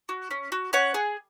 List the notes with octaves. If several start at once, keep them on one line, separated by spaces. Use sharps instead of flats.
F#4
C#4
F#4
C#4 C#5 F#5
G#4